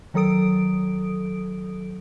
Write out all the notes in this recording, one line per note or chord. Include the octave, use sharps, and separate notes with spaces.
D#3 F#3 A4 D#6 D7